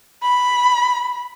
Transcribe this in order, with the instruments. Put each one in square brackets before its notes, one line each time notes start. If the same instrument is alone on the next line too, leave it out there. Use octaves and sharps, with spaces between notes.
[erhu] B5